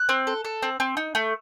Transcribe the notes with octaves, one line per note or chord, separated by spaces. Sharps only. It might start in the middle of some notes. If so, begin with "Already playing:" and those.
Already playing: F#6
C4
A4
A4
C4
C4
D#4
A3